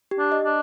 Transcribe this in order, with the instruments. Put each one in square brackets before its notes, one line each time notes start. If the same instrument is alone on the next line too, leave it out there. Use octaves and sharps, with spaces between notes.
[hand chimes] G4
[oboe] D4
[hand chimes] D#5
[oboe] D4